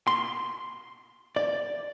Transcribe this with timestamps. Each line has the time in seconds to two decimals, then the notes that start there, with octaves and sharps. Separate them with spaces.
0.07 C6
1.36 D5